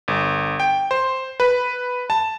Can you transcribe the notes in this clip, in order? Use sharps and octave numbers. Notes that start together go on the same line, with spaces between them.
G1
G5
C5
B4
A5